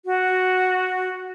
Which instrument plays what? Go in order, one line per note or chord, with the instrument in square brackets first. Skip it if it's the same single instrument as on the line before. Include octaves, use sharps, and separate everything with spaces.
[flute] F#4